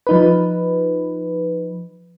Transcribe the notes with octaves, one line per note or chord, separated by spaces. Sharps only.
F3 D#4 B4